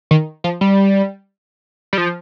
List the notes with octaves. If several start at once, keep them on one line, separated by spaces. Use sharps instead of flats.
D#3
F3
G3
G3
F3